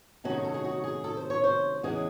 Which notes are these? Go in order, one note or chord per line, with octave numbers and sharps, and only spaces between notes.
C3 D#3 F#3 A3 C#4 F#4
G#4
A4
G#4
F#4
G#4
A4
C5
C#5
C5
E2 C#3 E3 G#3 G#4